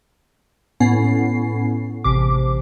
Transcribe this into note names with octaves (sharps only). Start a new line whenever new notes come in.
A2 B3 C#4 C7
A1 C3 D6